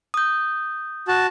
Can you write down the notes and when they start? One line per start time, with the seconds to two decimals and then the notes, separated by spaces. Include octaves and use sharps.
0.14 D#6 G6
1.08 F#4 A5